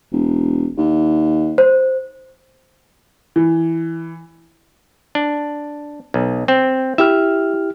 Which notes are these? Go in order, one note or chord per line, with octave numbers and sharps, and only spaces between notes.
E1
D#2
C5
E3
D4
B1
C4
E4 G4 E5 F6